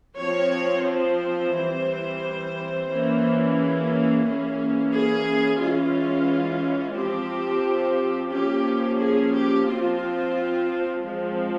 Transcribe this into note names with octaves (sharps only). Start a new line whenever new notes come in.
F3 C4 C#5
C5
E3 G3 C4
E3 A#3 C#4
G#4
E3 A#3 C#4
G#4
E3 G#3 C#4 F4
F3 C4 G4
F3 A#3 C#4 G4
G#4
G4
F3 C4 F4
F3 G#3 C4